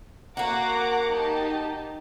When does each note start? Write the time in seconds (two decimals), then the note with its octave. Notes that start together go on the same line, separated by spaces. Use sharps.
0.37 A#3 F#4 F#5 A#5 D6
1.10 D#4 G4 A5